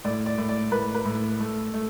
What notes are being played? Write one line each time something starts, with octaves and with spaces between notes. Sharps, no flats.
A2 D5
D5
A2
D5
A2 B4
B4
A2
A3
A3